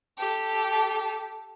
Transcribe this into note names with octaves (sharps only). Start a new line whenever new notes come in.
G4 A4